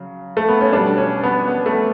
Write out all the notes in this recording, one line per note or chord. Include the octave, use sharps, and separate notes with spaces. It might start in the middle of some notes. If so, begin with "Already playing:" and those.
Already playing: C#3 F#3
A3
B3
C#4
B2 G3 D4
C#4
B3
B3
A3